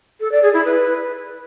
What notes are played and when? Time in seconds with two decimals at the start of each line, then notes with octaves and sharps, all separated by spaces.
0.21 A4
0.32 D5
0.43 G#4
0.54 E4
0.65 B4